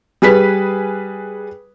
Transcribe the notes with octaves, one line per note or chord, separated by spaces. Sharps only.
G3 G#4 B4 B6